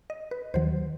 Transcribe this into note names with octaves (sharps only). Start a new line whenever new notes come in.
D#5
B4
D#2 D#3 F#3 C5